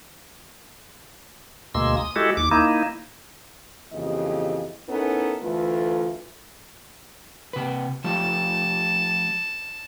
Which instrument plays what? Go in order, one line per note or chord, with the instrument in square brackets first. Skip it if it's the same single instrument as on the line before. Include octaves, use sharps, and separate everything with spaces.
[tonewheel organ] D2 B2 G#3 A#3 C6 E6
D#6
G#3 E4 F#4 G4 A4
D#2 D6
A#3 D#4 E4
[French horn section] F2 C#3 E3 A#3 G4 D#5
B3 C#4 D#4 E4 A4 A#4
D2 E3 A3 F4 A4 B4
[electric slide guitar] C3 B4
[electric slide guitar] F3 A3 G4 [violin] A5